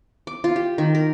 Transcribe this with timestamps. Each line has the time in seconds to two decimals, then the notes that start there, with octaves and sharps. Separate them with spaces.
0.27 D6
0.44 F4
0.56 G4
0.78 D#3
0.95 A#4